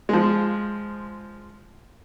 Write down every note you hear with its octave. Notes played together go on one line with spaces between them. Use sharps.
F3 G#3